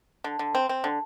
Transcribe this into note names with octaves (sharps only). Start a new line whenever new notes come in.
D3
D3
C4
C4
D3